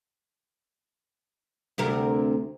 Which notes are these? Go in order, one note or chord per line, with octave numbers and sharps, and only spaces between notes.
D2 C3 A#4